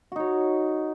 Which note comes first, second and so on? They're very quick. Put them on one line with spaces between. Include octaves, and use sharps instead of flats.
F#4 D#4 C#5